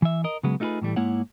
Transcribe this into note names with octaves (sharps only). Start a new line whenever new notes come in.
E3 E5
A#4 D#5
C#3 F#3 G#3 B3
A3 D#4 F4 F#4 G#4 B4
A2 E3 G3 A3
G#2 G#3 A#3 E4 C#5 F#5